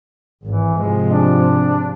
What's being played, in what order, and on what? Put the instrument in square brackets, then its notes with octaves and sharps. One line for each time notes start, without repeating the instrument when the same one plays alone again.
[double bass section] G#1 [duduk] E3
[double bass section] G#2 C3 F3 [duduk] G#3
[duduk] D4